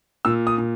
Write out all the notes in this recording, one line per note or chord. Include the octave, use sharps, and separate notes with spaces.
A#2 E6
D#6
A#2